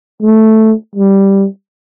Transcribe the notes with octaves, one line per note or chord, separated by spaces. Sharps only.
A3
G3